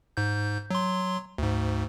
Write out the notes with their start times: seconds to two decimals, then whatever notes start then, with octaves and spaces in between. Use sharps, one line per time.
0.17 G#2 G6
0.71 F#3 C6
1.38 D2 G#2